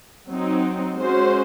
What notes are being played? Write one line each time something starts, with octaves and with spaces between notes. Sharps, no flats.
F#3 C4 D#4
G#3 C#4 F#4 C5